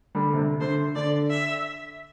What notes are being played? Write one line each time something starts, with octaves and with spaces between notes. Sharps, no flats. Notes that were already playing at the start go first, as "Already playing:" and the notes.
D3 G3
C3
D3
D3 C5
D3 D5
E5